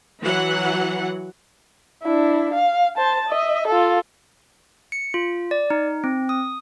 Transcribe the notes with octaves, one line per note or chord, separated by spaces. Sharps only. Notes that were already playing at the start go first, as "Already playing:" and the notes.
E3 F#3 F#5
D4 E4
F5
C5 A5
D#5 E5
F4 A4
C#7
F4
D5
D#4
C4
D#6